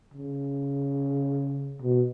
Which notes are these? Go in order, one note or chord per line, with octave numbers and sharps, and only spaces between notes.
C#3
B2